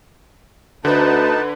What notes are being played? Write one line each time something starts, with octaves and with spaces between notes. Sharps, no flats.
D2 D3 D#4 B4 A5